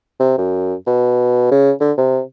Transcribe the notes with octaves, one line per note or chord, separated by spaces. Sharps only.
C3
F#2
B2
C#3
D3
C3